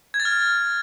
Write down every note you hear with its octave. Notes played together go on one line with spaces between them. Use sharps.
G#6
A6
F6